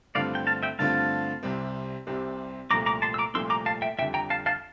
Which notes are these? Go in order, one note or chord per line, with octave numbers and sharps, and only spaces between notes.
G2 D3 A3 C4 F4 D5 F5
G5
F5 A5
E5 G5
G2 D3 A3 C4 F4 F5 A5
C2 C3 G3 C4
C2 C3 G3 C4
C2 A#2 F3 A3 A#5 D6
A#5 D6
A5 C6
E6
A#5 D6
C2 A#2 F3 A3 C6 E6
A#5 D6
F5 A5
E5 G5
F2 D3 G3 E5 G5
G5 A#5
F5 A5
F5 A5